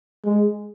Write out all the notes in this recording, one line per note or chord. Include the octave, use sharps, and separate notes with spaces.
G#3